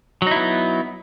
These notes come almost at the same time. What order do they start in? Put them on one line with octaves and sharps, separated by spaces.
F#3 D#4 E4 B3